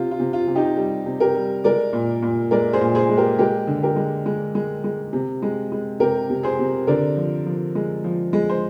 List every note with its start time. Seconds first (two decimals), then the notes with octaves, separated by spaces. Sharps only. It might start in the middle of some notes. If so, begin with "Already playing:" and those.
Already playing: C3 F4
0.11 F4
0.20 C3
0.33 F4
0.47 C3
0.55 D#4 G4
0.77 G3
1.06 C3
1.20 G4 A#4
1.35 G3
1.64 G#3 A#4 D5
1.93 A#2
2.22 A#2
2.51 G#3 A#4 D5
2.73 G#4 C5
2.81 A#2
2.95 G#4 C5
3.09 G#3
3.17 G4 A#4
3.39 G#3 G4 A#4
3.67 D3
3.83 G4 A#4
3.96 G#3
4.26 G#3
4.55 G#3
4.84 G#3
5.13 C3
5.42 G#3
5.72 G#3
6.00 C3 G4 A#4
6.30 C3
6.43 G#4 C5
6.59 C3
6.87 D3 A#4 D5
7.16 F3
7.46 F3
7.75 G#3
8.04 F3
8.33 G#3
8.50 C5